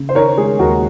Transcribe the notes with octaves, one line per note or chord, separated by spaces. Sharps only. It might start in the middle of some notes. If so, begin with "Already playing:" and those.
Already playing: C#3
C5
D#3 A#4 C#5
G#3 G#4
D#2 F#4 A#4